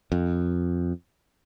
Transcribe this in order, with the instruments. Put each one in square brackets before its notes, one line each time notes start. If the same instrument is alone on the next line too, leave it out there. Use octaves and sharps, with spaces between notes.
[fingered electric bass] F2